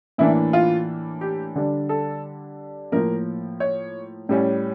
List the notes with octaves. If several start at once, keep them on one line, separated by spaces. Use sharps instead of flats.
A2 E3 A#3 D4 E4
F4
G4
D3 G3 D4
A4
A2 F3 A#3 A#4
C#5
A2 G3 C#4